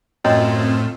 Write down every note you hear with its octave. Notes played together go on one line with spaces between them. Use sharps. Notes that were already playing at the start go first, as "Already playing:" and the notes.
F#2 A2 C4 F4 C#5 D#5 G5